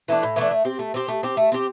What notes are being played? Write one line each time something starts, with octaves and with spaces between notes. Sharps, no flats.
E3 A3 D4
A2
E3 A3 D4
A3
C4 G4
A3
C4 G4
A3
C4 G4
A3
C4 G4